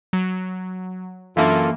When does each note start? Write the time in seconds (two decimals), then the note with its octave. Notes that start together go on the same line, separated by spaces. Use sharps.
0.13 F#3
1.37 F#2 E3 A#3 D4 F4 A4 E5 F5